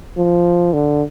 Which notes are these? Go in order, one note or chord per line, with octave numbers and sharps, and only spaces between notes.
F3
D3